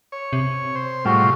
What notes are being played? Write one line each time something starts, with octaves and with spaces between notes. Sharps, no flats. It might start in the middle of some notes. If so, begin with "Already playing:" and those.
C#5
C3
C5
A2 G3 G#3 F4 F#4